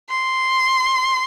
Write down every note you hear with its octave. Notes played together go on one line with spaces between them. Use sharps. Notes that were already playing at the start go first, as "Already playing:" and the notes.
C6